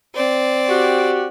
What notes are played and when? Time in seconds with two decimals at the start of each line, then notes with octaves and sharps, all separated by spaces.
0.15 C4 D5
0.69 F#4 G4